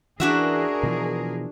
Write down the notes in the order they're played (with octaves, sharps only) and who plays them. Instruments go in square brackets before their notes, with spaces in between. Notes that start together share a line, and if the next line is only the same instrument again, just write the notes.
[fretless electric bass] E3 [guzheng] D4 F#4 E5 [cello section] G#4 A#4
[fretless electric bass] B2 E3 F3